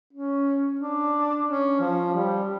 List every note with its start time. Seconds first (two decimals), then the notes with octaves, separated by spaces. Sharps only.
0.13 C#4
0.79 D4
1.47 C#4
1.80 F3
2.14 G3